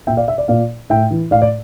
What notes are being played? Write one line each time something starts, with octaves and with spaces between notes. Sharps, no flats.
A#2 E5 G5
D5 F5
E5
D5
A#2 D5 F5
A2 E5 G5
E3
A2 D5 F5
D5